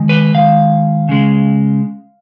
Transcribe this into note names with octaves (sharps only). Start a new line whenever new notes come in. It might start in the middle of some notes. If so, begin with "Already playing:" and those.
Already playing: D#3 G#3
B4
D#3 G#3 F5
C#3 G#3